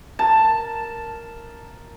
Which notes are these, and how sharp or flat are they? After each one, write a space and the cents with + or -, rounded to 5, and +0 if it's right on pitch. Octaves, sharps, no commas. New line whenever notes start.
A#4 +0 A5 +0